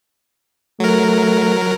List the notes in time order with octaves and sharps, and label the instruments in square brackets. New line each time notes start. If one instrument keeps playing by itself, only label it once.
[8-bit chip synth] F#3 A#4 [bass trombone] A3